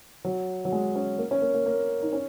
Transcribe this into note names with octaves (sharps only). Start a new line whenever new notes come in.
F#3
F#3
G#3
C#4
A#3
C#4
A#3
A#3
A#3
D#4
C#4